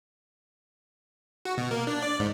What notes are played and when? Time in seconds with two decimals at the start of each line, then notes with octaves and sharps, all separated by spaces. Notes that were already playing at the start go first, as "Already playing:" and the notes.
1.45 F#4
1.58 B2
1.71 A#3
1.87 D4
2.02 D5
2.19 G#2